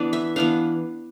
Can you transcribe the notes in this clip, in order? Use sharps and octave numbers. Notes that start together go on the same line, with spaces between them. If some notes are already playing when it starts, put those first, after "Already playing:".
Already playing: E3 B3 D4 D5
E5
E3 B3 D4 F5